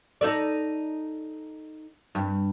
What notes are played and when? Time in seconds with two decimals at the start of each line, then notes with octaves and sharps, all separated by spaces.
0.21 D#4 A4 D5
2.15 G2